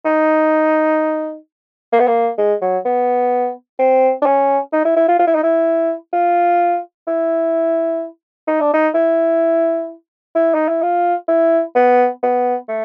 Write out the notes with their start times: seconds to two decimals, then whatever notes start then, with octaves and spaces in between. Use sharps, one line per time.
0.05 D#4
1.92 A#3
2.00 B3
2.07 A#3
2.38 G#3
2.62 F#3
2.85 B3
3.79 C4
4.22 D4
4.26 C#4
4.73 D#4
4.85 E4
4.96 E4
5.08 F4
5.19 F4
5.27 E4
5.35 D#4
5.43 E4
6.13 F4
7.07 E4
8.47 D#4
8.60 D4
8.73 D#4
8.94 E4
10.35 E4
10.54 D#4
10.68 E4
10.82 F4
11.28 E4
11.75 B3
12.23 B3
12.68 A3